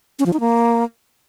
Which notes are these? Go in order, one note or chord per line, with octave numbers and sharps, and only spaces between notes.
C#4
F3
D#4
A#3